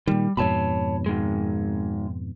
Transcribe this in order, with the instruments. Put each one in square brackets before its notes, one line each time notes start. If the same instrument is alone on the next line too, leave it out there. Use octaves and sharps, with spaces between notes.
[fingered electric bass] A#2 D#3 [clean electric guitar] G3
[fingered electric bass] F2 G#2 B2 [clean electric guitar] C#5 A5 B5
[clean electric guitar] D#3 G#3